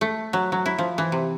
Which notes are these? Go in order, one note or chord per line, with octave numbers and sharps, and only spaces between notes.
A3
F#3
F#3
E4
F3
E3
C3